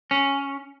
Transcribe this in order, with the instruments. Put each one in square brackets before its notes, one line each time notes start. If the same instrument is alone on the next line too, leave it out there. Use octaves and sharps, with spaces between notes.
[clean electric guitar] C#4